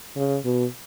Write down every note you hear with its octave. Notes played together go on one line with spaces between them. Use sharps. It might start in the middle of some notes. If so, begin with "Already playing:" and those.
C#3
B2